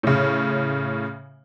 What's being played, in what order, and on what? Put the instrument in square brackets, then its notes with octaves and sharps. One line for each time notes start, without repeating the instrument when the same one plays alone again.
[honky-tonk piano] A2 C#3